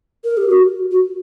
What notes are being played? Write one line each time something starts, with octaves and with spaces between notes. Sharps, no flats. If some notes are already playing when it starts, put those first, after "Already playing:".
A#4
G4
F#4
F#4